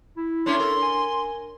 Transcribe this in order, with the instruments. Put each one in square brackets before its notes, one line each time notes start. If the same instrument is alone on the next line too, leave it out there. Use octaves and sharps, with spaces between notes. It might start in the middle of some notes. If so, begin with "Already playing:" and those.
[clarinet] E4
[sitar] A3 C#4 D4 [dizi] C6
[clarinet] A4 [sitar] A#4
[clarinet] G#5